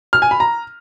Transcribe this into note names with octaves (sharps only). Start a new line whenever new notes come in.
F6
G#5
B5
A#5